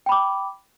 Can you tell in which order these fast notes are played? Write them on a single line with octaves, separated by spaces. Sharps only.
G5 B5 D6